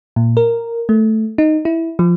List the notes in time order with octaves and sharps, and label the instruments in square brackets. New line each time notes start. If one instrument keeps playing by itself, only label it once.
[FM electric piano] A#2
A#4
A3
D#4
E4
F3